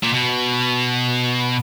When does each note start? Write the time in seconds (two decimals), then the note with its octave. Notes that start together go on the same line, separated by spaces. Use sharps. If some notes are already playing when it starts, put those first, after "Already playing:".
0.04 A#2
0.14 B2